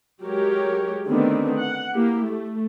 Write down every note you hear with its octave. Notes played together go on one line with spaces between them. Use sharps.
F#3 G#3 G4 A#4 C#5
D3 D#3 A3 B3 C4 D4
F#5
A#3 E4 G4
A3